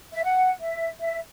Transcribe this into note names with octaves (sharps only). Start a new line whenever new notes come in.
E5
F#5
E5
E5